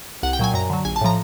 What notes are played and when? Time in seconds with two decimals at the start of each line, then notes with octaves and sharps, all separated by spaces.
0.23 C2 F#5
0.33 G5
0.39 A#2 F#3 G#5
0.54 F#2 A#5
0.70 D3 F#3
0.85 A#1 G#5
0.96 A5
1.01 A2 F3 A#5